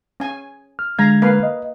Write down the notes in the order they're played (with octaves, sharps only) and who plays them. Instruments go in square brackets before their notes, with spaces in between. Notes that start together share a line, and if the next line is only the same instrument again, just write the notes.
[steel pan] C#4 G#5
[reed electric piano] F6
[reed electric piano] D3 G#3 G#6 [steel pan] F5 A#5
[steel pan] A#3 B4 F5
[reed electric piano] D#5